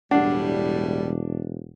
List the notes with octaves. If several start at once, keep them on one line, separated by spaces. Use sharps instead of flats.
E1 A2 G3 D4 F#5